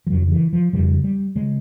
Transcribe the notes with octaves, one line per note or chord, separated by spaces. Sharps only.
F3
F2 C#3 F#3
F3
E3
F3
F2 C#3 G3
G3
C#3 G#3